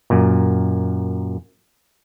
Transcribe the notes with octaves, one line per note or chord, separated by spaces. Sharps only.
F#2 A#2